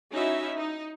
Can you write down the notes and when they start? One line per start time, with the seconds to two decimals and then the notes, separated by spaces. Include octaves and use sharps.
0.11 C#4 D#4 E4 F#4 E5
0.57 D#4